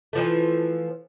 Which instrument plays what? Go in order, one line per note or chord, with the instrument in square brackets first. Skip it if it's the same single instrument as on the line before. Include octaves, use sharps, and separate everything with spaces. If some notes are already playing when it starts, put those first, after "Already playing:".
[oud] E3 F3 A3